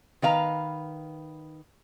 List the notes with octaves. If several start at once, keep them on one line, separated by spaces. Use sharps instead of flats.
D#3 B4 F5 A#5